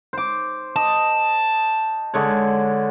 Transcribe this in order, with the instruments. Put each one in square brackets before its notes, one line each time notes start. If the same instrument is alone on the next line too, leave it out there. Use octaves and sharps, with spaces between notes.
[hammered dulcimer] C5 D6
[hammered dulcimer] D#5 [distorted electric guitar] A5
[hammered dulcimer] D3 G#3 C#5